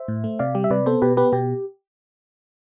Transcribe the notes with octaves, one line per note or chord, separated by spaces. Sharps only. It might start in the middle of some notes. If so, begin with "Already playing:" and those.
Already playing: C5 E5
A2
A3
C3 D5 F5
G3 G4
E5
C3 B4 D5
B3 A4 C5
B2 G4 B4
B3 G4 B4
B2 G4